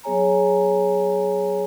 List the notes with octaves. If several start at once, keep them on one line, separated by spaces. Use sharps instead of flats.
F#3 B3 G#4 C#5 G#5 A#5